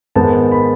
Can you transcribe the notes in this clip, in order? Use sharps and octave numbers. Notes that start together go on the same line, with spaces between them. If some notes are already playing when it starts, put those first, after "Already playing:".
G#2 D#3 G#3 B3 A5
B5